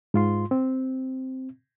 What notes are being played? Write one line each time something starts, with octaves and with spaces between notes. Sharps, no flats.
G#2 F4 C6
C4